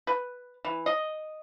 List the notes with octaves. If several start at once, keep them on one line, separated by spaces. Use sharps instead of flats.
B4
E3
D#5